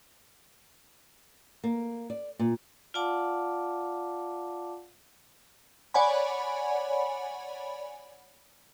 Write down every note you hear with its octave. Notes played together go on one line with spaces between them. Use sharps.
A#3
D5
A#2
F4 D5 F5 F#5 A5 D6
C#5 D5 F#5 G#5 B5